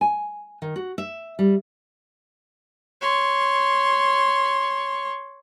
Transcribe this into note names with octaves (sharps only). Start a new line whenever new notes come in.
G#5
D#3
F#4
E5
G3
C#5 C6